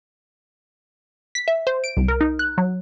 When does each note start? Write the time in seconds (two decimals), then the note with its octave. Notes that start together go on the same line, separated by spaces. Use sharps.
1.35 B6
1.48 E5
1.67 C5
1.84 D7
1.97 C2
2.08 A#4
2.21 D#4
2.39 F#6
2.58 F#3